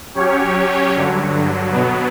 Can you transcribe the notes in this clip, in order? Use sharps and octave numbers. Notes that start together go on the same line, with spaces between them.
F#3 C#4 G4 C#5
G2 D3 F#3
B2 F#3 B3